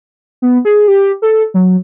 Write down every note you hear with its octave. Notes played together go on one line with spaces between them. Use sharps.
B3
G#4
G4
A4
F#3